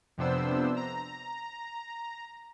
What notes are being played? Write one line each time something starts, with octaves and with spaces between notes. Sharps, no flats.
F2 C3 B3 D4 C5 E6
A#5